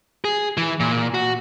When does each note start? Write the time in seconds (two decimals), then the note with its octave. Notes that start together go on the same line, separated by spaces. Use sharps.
0.25 G#4
0.57 E3
0.80 A#2
1.14 F#4